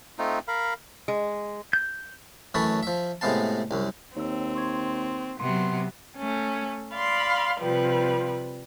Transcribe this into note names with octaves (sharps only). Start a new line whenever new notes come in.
A3 C4 D#4 F4
A#4 F5 B5
G#3
G6
F#2 E3 A3 C#5 A5 B5
F3 E5
A2 C3 G#3 B3 F5 A5
C2 F#2
D#2 C4 C#5 E6
C6 C#6 G#6
C3 F#3 B3 C6
A3 C#4
D5 F5 B5 C6
C3 F3 G3 B4